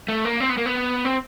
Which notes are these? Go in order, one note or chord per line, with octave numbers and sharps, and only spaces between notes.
A3
A#3
C4
B3
A#3
B3
C4